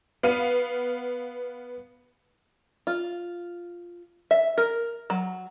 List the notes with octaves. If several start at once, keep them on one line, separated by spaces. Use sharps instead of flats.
B3 F5 D#7
F4
E5
A#4
F#3